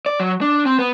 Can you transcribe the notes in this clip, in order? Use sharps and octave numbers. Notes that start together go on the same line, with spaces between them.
D5
F#3
D4
C4
B3